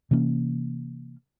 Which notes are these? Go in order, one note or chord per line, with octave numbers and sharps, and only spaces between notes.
C3 E3 A#3 C#4